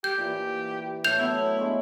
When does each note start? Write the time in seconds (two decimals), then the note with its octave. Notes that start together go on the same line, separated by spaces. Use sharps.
0.04 G4 G6
0.18 A#2 E3
1.04 A2 A3 G5 G6 F7
1.18 F#3 B3 E4
1.58 G#3 D4 C#5